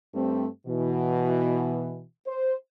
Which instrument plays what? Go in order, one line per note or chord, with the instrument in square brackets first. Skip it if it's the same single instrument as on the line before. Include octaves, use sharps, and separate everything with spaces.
[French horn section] G2 G3 A3 C4
B2 E3
C5